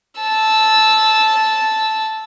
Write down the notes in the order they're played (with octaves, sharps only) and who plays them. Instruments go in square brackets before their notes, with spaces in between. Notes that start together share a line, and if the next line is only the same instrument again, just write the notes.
[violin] A5 E6